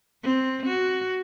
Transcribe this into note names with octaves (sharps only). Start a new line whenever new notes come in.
C4
F#4